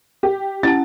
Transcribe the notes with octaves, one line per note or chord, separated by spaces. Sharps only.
G4
C#4 E4 F#5 A5 A6